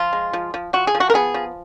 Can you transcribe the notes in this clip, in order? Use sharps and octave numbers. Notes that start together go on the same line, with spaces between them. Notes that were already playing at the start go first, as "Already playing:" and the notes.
Already playing: F3 F4
G#3
F3
F3
F3 F#4
G#4
F3
F#4
A#4
B3 G#4
F3